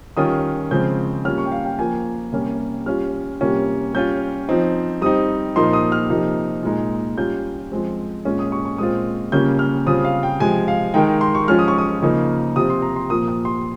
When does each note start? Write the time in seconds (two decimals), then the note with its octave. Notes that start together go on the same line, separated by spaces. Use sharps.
0.17 D#3 G3 C#4 F4 D#6
0.71 C#3 F3 G#3 C4 G6
1.25 G3 A#3 C#4 F4 F6
1.38 C#6
1.46 G5
1.52 F5
1.65 G5
1.79 F3 A#3 F4 G#5
2.33 C3 G3 A#3 C#4
2.86 G3 C#4 F4 F6
3.41 C3 G3 A#3 C#4 F4
3.94 G3 C#4 F4 G6
4.49 F3 C4 D#4
5.02 G3 C4 D#4 D#6
5.56 A#2 F3 A#3 D#4 C6
5.73 D#6
5.92 F6
6.10 C3 F3 A#3 D#4
6.63 A#2 G#3 D#4
7.17 G3 C#4 F4 G6
7.72 F3 G#3 C4
8.25 A#2 G#3 C#4 F4
8.39 D#6
8.52 C#6
8.65 C#6
8.78 A#2 G#3 C4 F4 D#6
9.32 C#3 G3 A#3 C#4 F4 G6
9.59 F6
9.86 C#3 G3 C4 F4 D#6
10.04 F5
10.23 G5
10.40 C3 F3 G#3 G#5
10.68 F5
10.94 D#3 G#3 D#4 G5
11.21 C6
11.35 C#6
11.48 F3 G#3 C#4 F4 F6
11.59 D#6
11.68 C#6
11.78 D#6
12.02 C#3 F3 A#3 D#4
12.56 C3 F3 C4 F4 D#6
12.70 C6
12.82 A#5
12.96 C6
13.10 A#2 F3 A#3 D#6
13.28 D#6
13.45 C6